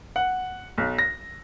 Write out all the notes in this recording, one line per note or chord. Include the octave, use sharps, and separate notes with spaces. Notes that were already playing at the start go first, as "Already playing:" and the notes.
F#5
B1
A#6